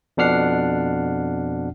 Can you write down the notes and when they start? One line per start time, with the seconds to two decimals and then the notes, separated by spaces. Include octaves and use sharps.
0.17 F2 B2 D4 F#5 F6 C7